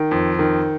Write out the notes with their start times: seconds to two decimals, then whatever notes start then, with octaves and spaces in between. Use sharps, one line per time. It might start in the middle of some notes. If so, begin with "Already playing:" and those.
Already playing: D#3
0.11 F2
0.39 D#3